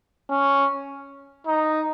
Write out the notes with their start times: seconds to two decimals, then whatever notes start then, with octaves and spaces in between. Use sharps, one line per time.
0.30 C#4
1.47 D#4